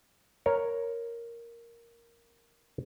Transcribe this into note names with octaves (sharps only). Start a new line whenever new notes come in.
A#4 C#5